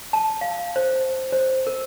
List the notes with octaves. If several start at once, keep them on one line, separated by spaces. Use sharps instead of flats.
A5
F5
C5
C5
A#4